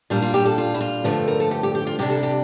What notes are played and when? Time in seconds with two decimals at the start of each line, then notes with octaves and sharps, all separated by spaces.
0.10 A#2 G3 D4 F4
0.22 F4
0.34 G4
0.46 A4
0.58 F4
0.74 E4
0.81 F4
1.04 G2 D3 F3 A3
1.28 A#4
1.40 A4
1.51 G4
1.63 G4
1.75 G4
1.87 F4
1.99 C3 G3 D4 G4
2.10 A4
2.23 G4